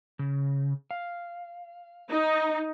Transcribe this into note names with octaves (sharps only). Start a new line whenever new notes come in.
C#3
F5
D#4